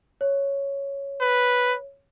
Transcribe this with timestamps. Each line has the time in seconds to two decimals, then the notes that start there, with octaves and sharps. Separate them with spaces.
0.21 C#5
1.21 B4